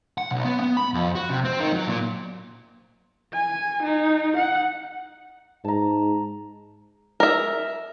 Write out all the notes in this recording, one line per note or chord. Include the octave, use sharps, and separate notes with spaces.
F#5
B1
B3
B3
B5
F2
F#4
C3
C4
D#3
F#3
A#2
G#5
D#4
F#5
G#2 A5 A#5
A#4 E5